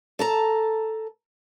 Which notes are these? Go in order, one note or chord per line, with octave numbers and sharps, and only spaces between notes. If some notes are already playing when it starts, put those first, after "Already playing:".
A4 A5 A#5